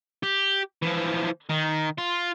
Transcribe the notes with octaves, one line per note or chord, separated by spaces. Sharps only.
G4
E3 F3
D#3
F4